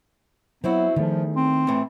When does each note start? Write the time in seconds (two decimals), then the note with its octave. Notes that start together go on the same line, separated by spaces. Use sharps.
0.64 F#3 B3 C4 E4 F#4
0.96 E2 D#3 F3 A3
1.36 C4
1.67 A2 E3